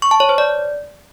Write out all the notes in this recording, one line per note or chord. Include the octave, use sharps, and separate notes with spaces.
C#6
A5
C#5
C5
D5